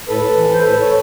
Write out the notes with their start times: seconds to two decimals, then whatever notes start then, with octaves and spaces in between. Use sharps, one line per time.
0.08 A2 A4 B4
0.36 E3
0.53 C5
0.63 A2 A4 B4
0.81 C#5